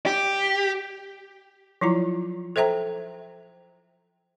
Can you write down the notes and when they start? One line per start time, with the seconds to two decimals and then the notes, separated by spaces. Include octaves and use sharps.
0.06 G4
1.81 F3 F#3 E4 F4 A#5
2.56 A4 C5 E5 G5 A#5